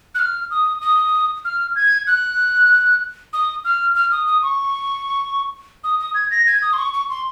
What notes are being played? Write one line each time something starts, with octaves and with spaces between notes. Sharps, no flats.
F#6
F6
D#6
D#6
F6
G#6
F#6
D#6
F6
F6
D#6
D#6
C#6
D#6
D#6
G#6
A#6
G#6
D#6
C6
C#6
C#6
C6